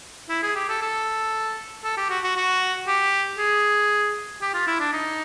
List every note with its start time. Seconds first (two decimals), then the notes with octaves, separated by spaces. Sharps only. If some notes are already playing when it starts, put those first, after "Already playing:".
0.30 E4
0.43 G#4
0.55 G4
0.69 A4
0.82 A4
1.84 A4
1.97 G4
2.10 F#4
2.24 F#4
2.37 F#4
2.88 G4
3.39 G#4
4.42 G4
4.54 F4
4.67 E4
4.80 D4
4.93 D#4